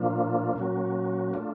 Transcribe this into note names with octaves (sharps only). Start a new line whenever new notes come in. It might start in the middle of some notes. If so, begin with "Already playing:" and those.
Already playing: A#2 F3 A#3 D4 F4
A#2 F#3 A#3 C#4 F#4
A3 D4 F4